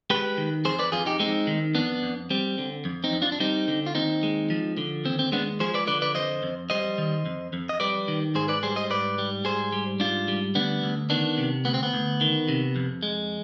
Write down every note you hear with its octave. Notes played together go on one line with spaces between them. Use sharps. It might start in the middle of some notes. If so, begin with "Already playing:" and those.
G#3 G4 B4
D#3
F2 G#4 C5
B4 D5
F2 F4 G#4
D#4 G4
G#3 C4 D#4
D#3
F2 B3 D4
F2
G3 C4
D3
F2
C4 D#4
F2
D4 F4
D4
G3 C4 D#4
D3
F4
D#2 C4 D#4
G#3
F3
D3
D#2 C4
C4
G#3 B3 D4
F3 G#4 C5
B4 D5
D3 B4 D5
B4 D5
F2 C5 D#5
F2
G3 C5 D#5
D#3
F2
F2
D#5
G3 B4 D5
D#3
G#2 G#4 C5
B4 D5
G3 G#4 C5
C5 D#5
G#2 B4 D5
G3
G#2 G#4 C5
G3
G#2 D4 F4
G3
D2 B3 D4
D2
D#3 B3 D4
C3
D2 B3
C4
B3
D2
D#3
C3
F2
G#3